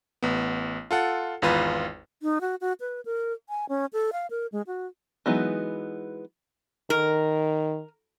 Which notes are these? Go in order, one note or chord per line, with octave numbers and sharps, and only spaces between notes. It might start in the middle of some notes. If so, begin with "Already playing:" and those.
A1 B3
F4 A4 F#5
G#1 E2 F4 B4
D#4
F#4
F#4
B4
A#4
G#5
C#4
A4
F5
A#4
G#3
F#4
E3 F#3 G#3 B3 D#4
D#3 A#4